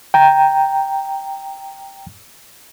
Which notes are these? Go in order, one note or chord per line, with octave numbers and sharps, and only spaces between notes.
G5 A#5